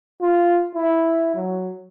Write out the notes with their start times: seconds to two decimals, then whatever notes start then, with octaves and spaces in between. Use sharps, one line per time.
0.21 F4
0.75 E4
1.35 F#3